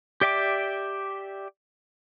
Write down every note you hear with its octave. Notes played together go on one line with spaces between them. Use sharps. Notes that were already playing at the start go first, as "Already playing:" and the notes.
G4 D5 E5 G5 D6